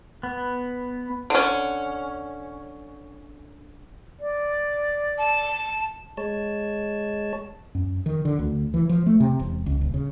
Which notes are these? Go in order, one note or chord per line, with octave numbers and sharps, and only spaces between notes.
B3
D3 C#4
D5
A5
G#3 C#5 A5
F#2
D#3
D3
D2
E3
F3
A3
C3
E1
C#2
D#1
C#3